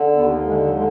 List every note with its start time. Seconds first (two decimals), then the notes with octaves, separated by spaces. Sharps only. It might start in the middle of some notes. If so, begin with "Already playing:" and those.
Already playing: D3
0.15 D#2 B3
0.45 D3 G#3
0.66 F#3
0.74 D3 G#3